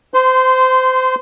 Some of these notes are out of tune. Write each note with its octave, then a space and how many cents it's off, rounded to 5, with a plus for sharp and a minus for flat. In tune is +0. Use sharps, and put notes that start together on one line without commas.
C5 -25 C6 -10